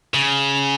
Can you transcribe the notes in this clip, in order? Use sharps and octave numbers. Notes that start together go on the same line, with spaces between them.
C#3